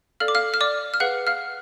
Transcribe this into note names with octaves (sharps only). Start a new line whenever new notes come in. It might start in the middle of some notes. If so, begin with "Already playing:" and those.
A4 D5 F5 F6
D6
F5 F6
F6
D5 D6
F6
G#4 B4 F5 F#5 F#6
F5 F6